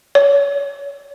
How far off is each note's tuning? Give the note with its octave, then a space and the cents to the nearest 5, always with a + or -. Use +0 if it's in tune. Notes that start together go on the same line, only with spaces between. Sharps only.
C#5 +30